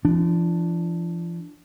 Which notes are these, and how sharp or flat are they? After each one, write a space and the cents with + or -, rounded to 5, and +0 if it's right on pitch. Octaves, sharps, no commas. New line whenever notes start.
F3 -45 D4 +0